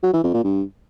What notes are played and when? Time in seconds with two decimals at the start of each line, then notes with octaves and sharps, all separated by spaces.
0.03 F#3
0.13 E3
0.23 F2
0.34 A#2
0.44 G2